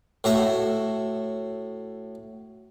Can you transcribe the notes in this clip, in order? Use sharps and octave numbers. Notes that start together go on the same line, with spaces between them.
A2 F#4 E5 A#5